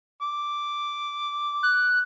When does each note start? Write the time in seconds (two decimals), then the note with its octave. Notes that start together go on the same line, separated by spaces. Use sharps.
0.22 D6
1.63 F#6